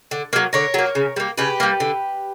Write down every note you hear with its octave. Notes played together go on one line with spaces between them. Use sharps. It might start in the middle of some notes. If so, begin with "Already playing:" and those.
D3
F#3 A#3
D3 A#4 C#5
F#3 A#3
C#3
G3 A#3
C#3 G4 B4
G3 A#3
D3